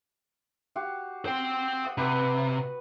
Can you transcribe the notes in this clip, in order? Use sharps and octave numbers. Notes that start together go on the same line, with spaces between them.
F#4 G4 F5
C5 G5
F#5 D#6
C3 F#4 B4